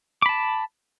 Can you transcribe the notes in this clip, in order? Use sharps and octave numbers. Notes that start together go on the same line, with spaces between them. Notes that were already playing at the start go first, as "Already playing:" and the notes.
A5 B5 D6